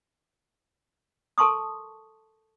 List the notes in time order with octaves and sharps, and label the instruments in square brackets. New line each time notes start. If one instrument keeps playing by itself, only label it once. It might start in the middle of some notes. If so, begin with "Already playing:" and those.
[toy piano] A4 A#4 A5 C6 C#6 D#6